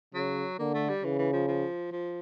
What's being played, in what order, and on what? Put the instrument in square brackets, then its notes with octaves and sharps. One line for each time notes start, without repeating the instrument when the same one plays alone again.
[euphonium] C#3 [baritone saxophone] F#3
[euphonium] D3 [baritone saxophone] A#3
[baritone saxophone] A3
G3
[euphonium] C#3 [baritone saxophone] E3
[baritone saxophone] E3
F3
F3
F3